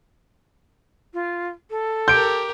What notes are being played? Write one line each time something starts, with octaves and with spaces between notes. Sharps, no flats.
F4
A4
G4 A#4 G6 D7